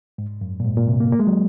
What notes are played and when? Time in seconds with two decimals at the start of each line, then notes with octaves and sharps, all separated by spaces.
0.18 G#2
0.41 F#2
0.60 A#2
0.65 G#2
0.77 A#2
0.88 C3
1.00 A#3
1.12 A#3
1.19 G#3
1.27 F#3